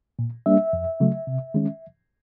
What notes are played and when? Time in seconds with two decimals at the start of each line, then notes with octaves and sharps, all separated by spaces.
0.19 A#2
0.46 G3 A#3 D4 E5
0.73 F2
1.00 C#3 F#3 A3
1.27 C3
1.54 D#3 G#3 C#4